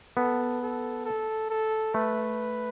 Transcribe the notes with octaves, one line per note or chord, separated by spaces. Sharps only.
B3 A4
A4
A4
A4
A3 B4